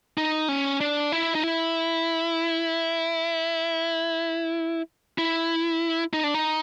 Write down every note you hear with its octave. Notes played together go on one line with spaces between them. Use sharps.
D#4
C#4
D4
E4
D#4
E4
E4
D#4
D4
D#4